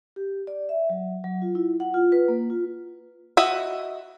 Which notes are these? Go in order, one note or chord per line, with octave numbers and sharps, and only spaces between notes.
G4
D5
E5
F#3
F#3
F4
E4
F#5
F4
B4
A#3
F4
F#4 D#5 E5